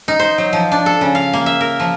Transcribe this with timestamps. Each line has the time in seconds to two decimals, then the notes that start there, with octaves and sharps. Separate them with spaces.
0.08 D#4
0.19 C5
0.38 F#3
0.53 F3
0.72 D4
0.86 A4
1.01 C#3
1.15 F5
1.33 A#3
1.46 E5
1.61 A#4
1.80 F3